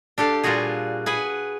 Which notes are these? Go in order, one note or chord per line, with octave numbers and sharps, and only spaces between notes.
D4 G4 A4 F5
A#2 G3 F4 F#4 G#4
G#4 B4 F#5 G#5